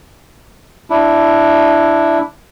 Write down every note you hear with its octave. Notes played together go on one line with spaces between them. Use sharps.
D4 E4